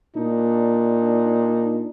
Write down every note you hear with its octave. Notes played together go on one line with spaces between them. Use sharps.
A#2 D4 D#4